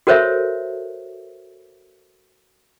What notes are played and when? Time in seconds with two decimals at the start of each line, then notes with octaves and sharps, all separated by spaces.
0.07 F#4 A4 A#4 C5 C#5 E5